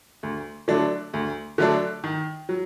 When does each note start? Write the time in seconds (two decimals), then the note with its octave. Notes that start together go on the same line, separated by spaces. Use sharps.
0.23 D2
0.68 D3 F#3 A3 D4
1.14 D2
1.58 D3 F#3 A3 D4
2.04 D#3
2.49 F#3